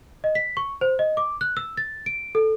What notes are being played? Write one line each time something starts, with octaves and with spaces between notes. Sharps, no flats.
D#5
B6
C#6
C5
D#5
D6
F#6
E6
A6
D7
A4